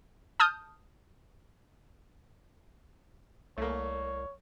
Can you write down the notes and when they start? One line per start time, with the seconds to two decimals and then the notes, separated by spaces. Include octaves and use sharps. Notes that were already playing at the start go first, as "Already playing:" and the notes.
0.40 A5 D#6 F6 G6
3.58 C2 A3 A#3 C#5